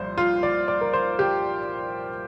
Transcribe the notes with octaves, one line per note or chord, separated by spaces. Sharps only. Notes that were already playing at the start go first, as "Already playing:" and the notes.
Already playing: C2 A#2 F3 C5
F4
D5
D5
A#4
C5
G4